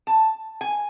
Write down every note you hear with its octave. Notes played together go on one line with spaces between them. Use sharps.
A5
G#5